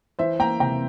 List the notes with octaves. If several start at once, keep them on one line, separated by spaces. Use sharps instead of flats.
E3 C5 E5
A#3 G5 A#5
C3 G5 A#5